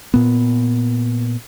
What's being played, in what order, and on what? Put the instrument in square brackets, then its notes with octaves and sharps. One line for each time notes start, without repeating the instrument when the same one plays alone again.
[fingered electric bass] A#2 B3